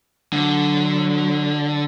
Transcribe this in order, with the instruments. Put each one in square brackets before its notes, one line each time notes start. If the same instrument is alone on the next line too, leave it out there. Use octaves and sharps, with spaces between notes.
[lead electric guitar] D3 [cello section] F#3